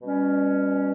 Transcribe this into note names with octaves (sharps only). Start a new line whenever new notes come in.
B2 G3 C#4